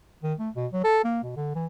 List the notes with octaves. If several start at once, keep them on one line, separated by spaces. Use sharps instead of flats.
D#3
A3
B2
F#3
A4
A#3
B2
D3
E3